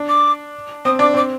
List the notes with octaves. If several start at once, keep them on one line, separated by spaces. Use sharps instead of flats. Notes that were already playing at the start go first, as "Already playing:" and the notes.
Already playing: D4
D6
C4 D#6
D4 D6
C4 D6